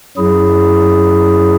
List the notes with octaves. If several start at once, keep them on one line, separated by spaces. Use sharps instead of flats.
F#2 F#3 E4 G#4